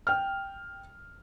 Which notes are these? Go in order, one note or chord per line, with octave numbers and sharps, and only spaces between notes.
G5 F6